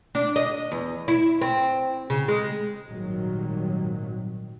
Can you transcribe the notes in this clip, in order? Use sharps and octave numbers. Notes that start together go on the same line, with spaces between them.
D4
D#5
E2
E4
C4
C#3
G#3
G#1 A#2 D#3 F#3 G3